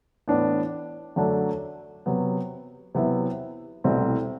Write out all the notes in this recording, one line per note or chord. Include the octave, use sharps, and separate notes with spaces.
A2 E3 B3 D4
F#2 D3 F#3 A3 D4
C3 F#3 B3
C3 F#3 B3 E4
C2 B2 A3 C4 E4